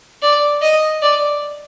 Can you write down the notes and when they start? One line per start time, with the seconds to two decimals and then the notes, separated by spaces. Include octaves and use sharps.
0.22 D5
0.62 D#5
1.02 D5